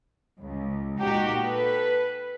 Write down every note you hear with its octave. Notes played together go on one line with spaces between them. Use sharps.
C#2
A#2 D#4 F#4 G4
A4 B4